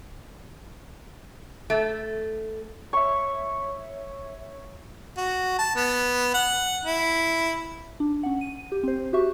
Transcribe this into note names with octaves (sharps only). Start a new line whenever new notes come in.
A3
C#5 E5 C#6
F#4
A5
B3
F#5
E4
D4
C#4 F#5
D#7
G4
C4 C5
F#4 G4 E5 C#6